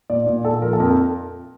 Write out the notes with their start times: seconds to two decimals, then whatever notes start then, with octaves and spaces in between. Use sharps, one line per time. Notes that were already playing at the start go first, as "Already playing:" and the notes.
0.10 A#2 D5
0.27 A#2
0.45 A#2 A4
0.62 F3 A#4
0.73 A4
0.80 F2 A#4